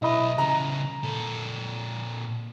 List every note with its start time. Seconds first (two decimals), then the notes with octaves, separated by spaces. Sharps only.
0.02 B1 B3 E4 D#5 B5
0.38 C#3 E3 A#5
1.03 A#2 A4